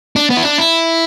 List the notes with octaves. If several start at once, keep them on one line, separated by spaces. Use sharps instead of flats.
D4
B3
E4
D4
E4